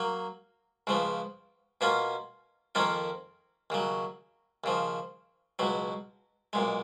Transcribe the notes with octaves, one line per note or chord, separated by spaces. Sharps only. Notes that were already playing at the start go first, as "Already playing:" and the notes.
Already playing: F#3 A#3
C#2 C#3 F3 B3
B2 A#3 C#4 F4
F2 D#3 A#3 C#4 F4
D#2 C#3 F#3
D#2 C#3 F3
C#2 B2 F#3
B1 A#2 G#3